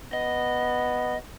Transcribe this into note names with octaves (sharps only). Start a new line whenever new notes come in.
B3 D#5